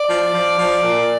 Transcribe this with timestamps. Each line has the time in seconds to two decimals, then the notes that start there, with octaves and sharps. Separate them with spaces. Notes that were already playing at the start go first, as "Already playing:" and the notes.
Already playing: D5
0.10 F3
0.34 F3
0.59 F3
0.84 A#2